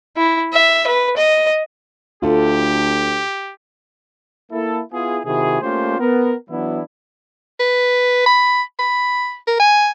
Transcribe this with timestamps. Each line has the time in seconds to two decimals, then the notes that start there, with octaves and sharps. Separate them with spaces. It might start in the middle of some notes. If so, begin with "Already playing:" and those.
0.17 E4
0.53 E5
0.87 B4
1.17 D#5
2.22 D2 F4 G4 A4
4.52 A#3 E4 A4
4.92 B3 E4 F4 G#4
5.25 C3 D#3 E4 F#4 G#4
5.61 A3 A#3 C#4 F4 G4 C5
5.99 B3 A#4
6.50 E3 F#3 B3 D4 E4
7.60 B4
8.26 B5
8.79 B5
9.47 A#4
9.60 G#5